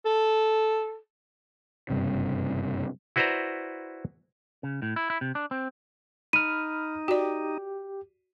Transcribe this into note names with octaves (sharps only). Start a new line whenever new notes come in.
A4
F#1 G2 C3
E4 F#4 B4 C5 D5 A#5
C#3
A2
E4
E4
C3
D4
C4
D#4 B5 F6 D#7
F#4 G4 D5